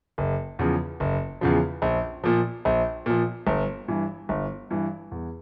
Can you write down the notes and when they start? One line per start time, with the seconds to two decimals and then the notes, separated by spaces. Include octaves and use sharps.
0.18 F#1
0.59 E2 C#3 F3
1.00 F#1
1.41 E2 C#3 F3
1.82 A#1
2.24 A#2 F3
2.65 A#1
3.06 A#2 F3
3.47 G1
3.88 G2 E3
4.29 G1
4.71 G2 E3
5.12 E2